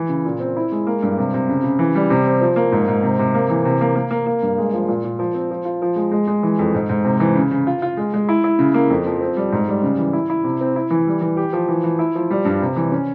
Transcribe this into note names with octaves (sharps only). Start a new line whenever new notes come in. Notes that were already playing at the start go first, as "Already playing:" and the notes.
Already playing: E3
C#3
A#2
C4
E4
G#3
A#3
G2
C3
C3
C#3
C#3
E3
G3
C3
C4
F3
A#3
G#2
G#2
C3
C3
A#3
E3
C3
A#3
A#3
A#3
A#3
G2
G#3
F3
A#2
A#2
F3
C4
F3
F4
F3
G#3
G#3
G#3
E3
F2
G#2
G#2
C3
E3
C#3
C#3
F4
F4
G#3
G#3
E4
E4
C#3
A#3
F2
F3
C4
G3
G#2
G3
C#3
E3
E4
E4
C3
C4
E4
E3
G3
E3
G4
F3
E3
E3
E4
F3
G3
G2
C3
E3
C#4